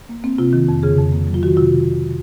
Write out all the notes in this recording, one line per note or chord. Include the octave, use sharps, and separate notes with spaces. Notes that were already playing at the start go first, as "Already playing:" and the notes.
A#3
A#3 C4
C3 F4
D#3
F2
C#3 G#4
F2
A#3
F#3
F4
D#3 F#4
C3 F4